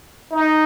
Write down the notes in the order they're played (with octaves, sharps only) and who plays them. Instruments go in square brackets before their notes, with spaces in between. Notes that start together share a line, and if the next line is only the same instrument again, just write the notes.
[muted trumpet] D#4